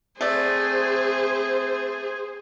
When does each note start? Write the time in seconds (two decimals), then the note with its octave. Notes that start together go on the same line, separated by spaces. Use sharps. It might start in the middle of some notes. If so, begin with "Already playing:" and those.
0.21 A3 C4 G#4 C5 D5